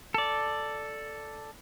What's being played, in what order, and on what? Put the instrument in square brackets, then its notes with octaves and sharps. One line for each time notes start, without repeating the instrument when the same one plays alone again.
[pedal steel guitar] A4 D5